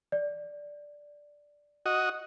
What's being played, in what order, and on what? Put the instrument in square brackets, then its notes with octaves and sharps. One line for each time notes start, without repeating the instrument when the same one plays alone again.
[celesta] D5
[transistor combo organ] F#4 D#5